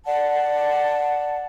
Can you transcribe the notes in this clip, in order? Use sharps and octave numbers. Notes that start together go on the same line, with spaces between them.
D5 F#5 A5